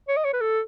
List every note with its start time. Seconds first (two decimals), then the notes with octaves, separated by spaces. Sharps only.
0.08 C#5
0.17 D#5
0.24 C#5
0.33 B4
0.41 A4